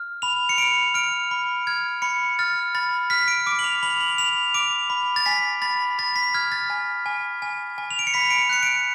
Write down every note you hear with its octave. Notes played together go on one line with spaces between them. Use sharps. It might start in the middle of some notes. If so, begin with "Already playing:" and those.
Already playing: F6
B5 F7
C#7
B5 D7
F6 D7
B5
F6 G#6
B5 C#7
F6 A6
B5 A6
F6 B6
D7
D6 D7
F#7
F7
B5 F#7
F#7
B5 F7
D6 D7
B5
A6
G#5 B6
B5 A6
B5 A6
B6
F6 G#6
A6
G#5
G#5
G#5
G#5
F7
D7
C#7
B5 B6
D7
C#7
F#6 C#7
D7